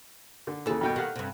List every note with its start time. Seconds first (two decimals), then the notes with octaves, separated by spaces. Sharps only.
0.47 D3
0.66 D#2 C#3 E3 A4
0.81 G2 B2 G5
0.96 D#3 G4 F5 F#5
1.16 G2 C3